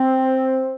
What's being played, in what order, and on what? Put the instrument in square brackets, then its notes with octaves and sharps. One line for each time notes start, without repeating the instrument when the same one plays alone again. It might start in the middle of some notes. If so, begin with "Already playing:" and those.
Already playing: [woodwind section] C4